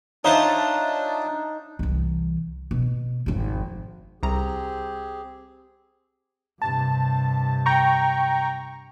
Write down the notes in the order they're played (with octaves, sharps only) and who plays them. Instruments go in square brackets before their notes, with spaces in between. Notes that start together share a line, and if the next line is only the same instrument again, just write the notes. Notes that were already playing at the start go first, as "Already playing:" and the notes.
[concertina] D4 [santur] D#4 [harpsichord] F4 C5 D#5 [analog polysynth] C#5 E5 A5
[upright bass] C2 E3
B2
G#1 F2
[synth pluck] C2 A#5 [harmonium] C4 G4 G#4
[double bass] G2 C3 [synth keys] A5
[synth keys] G5 A#5 C#6